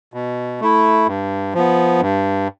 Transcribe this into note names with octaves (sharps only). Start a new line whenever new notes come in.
B2
A3 E4
G2
F3 B3
G2